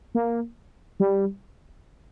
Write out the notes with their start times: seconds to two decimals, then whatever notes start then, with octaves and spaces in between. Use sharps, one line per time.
0.15 A#3
1.00 G3